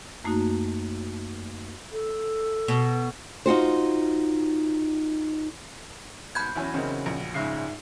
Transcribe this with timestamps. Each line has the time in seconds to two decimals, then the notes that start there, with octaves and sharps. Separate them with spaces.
0.24 F#2 A3 A#3 D#4 F#4
1.92 A4
2.68 B2
3.46 D#4 F4 F#4 C5
6.35 G#2 B2 B5 G6 G#6
6.55 E2 F#3 C#4 E4 G#5
6.74 C#3 C4 D#4 A#4
7.06 A#1
7.34 G#2 C#3 G#3 C#4 E5 C7